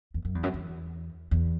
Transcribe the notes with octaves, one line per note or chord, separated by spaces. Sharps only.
E2
F#2
E2
F#2
E2
E2